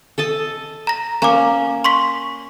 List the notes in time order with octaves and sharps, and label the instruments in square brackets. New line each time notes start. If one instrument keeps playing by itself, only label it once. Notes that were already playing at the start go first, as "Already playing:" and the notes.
[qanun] A4 D#5 A5
[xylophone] A#5 A#6
[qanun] A#3 C#4 [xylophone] A#5 D6
[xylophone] C6 C#6 B6